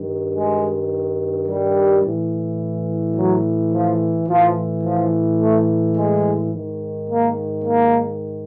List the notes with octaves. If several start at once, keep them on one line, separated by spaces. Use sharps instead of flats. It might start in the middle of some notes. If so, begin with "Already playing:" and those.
Already playing: G2 D#3
G#3
G3
A2 E3
F#3
F3
A2 E3 F3
F3
A3
G#3
G#2 D#3
A#3
A#3